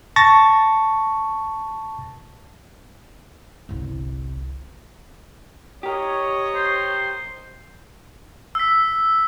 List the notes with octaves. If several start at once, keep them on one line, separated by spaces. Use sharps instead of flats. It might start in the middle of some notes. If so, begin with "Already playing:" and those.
A5 C#6 A6 A#6
G1 C2
G4 A#4 C#5 D#5
C5
E6 B6